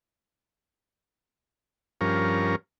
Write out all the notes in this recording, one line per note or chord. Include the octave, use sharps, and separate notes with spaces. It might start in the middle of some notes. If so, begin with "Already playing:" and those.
G2 F3 C#4 A#4